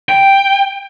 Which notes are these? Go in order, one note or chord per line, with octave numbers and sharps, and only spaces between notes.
G5